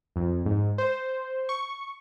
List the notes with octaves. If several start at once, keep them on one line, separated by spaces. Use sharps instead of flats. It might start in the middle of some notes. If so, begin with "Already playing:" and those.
F2
G#2
C5
C#6